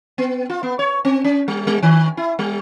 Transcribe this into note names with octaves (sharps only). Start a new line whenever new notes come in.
B3
F4
B3
C#5
C4
C#4
G3
G3
D#3
E4
G3